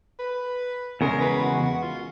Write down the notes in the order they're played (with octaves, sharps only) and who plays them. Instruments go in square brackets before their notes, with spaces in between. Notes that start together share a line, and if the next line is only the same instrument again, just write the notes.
[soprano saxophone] B4
[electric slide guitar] E2 C#3 G#3 [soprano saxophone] A#4
[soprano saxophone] B4
F#4
F#4
F4